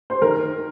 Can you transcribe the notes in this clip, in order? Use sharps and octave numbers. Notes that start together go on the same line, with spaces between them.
C5
D#3 A#4